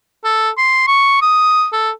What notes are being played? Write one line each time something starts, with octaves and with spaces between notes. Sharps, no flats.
A4
C6
C#6
D#6
A4